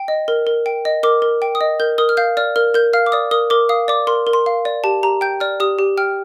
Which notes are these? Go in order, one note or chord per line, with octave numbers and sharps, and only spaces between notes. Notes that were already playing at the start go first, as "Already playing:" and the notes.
Already playing: G5
D#5
A#4
A#4
G5
D#5
A#4 D6
A#4
G5
D#6
D#5
A#4 G6
A#4 D#6
F6
F5 G6
D5 F6
A#4 F6
A#4 G6
F5 F6
D6
D5 D#6
A#4 D#6
A#4 D6
F5 D#6
D5 D6
A#4 C6
A#4
C6
F5
D5
G4 A5
G4 A#5
G5 G6
D5 F6
G4 D#6
G4
G5 F6